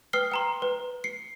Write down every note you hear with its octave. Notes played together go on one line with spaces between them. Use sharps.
B4 G5 D#6 F6 C7 G7
G5 A#5 C6
B4
C7 C#7